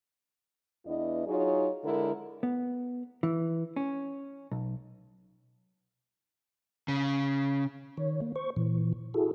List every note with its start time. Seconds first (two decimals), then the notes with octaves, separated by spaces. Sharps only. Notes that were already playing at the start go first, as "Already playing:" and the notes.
0.86 E2 B3 D4 E4 D#5
1.27 F#3 D#4 F4 G#4 C#5
1.84 D3 G#3 E4 A#4
2.43 B3
3.23 E3
3.76 C#4
4.51 B1
6.88 C#3
7.97 D#3 C#5
8.21 A#3
8.36 C5 C#6
8.56 A#2 E3
9.14 E4 F#4 G#4 A4